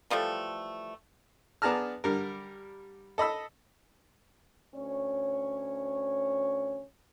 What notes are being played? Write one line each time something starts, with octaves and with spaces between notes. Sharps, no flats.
E3 F3 G3 A3
B3 D4 G#4 A5 A#5 F6
D3 G3 A#4
A4 D#5 B5 E6
D2 C#4 C#5